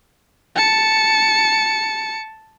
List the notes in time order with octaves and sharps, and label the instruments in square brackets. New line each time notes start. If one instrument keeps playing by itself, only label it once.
[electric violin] A5 C#7